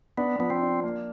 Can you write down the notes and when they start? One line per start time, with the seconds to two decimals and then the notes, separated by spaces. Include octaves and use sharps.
0.18 B3 D4
0.39 F3 B3
0.50 C4
0.61 D4
0.83 A#3